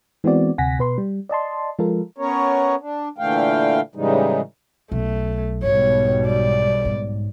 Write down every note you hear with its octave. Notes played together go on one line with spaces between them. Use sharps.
E3 G#3 B3 C4 F#4 D5
D2 C3 F#5 G#5 A#6 B6
B2 B4 C6
G3
D5 D#5 A5 C6
F3 G#3 F4 A4 A#4
B3 C#4 A#4 C#5
D4
A#2 D3 E3 A3 F5 G5
A2 C#3 E3 G3 G#3 D#4
B1 A3
B1 G#2 B2 G3 C#5
D5
G#2